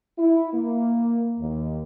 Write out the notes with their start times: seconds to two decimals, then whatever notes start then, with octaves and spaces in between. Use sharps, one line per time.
0.19 E4
0.54 A#3
1.39 D#2